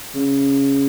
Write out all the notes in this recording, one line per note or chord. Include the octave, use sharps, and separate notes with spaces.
C#3